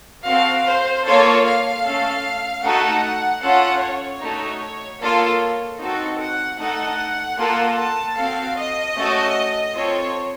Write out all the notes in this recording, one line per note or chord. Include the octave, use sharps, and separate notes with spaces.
C4 F#4 A4 F5
C5
A#3 F4 A4 C#5
F5
A3 C#4 A4
A3 D#4 F#4 A4 F#5
C#4 F4 A4 F#5
C#5
A3 D#4 F#4
A#3 F4 A4
C4 D#4 F#4 A4
F#5
A3 D#4 A4 F#5
A#3 F4 A4
A5
C4 F#4 A4 F5
D#5
A3 C#4 F#4 A4
C4 F4 A4 C#5